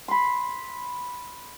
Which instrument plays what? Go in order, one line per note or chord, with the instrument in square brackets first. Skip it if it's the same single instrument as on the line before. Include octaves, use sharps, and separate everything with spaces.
[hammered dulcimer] B5 C6